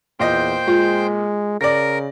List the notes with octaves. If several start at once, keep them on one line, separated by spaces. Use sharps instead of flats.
E2 A#2 C5 D#5 G5
G#3 F4
C#3 A#4 D5 A#6